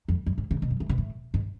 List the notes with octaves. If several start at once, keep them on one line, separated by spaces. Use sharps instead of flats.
F2
F#2
G#2
C#3
B2
F#2
A2
B2
A2
G#2